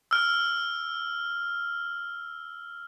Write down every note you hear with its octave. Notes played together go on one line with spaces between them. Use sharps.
E6 F6